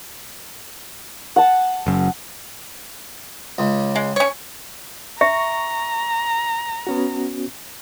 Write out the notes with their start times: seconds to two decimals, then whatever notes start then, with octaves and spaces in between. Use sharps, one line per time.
1.36 F#5 A5
1.86 F#1 F#2
3.58 C#2
3.96 G#3
4.16 C#4 C#5
5.21 E5 A#5 C#6
6.87 B3 C#4 F#4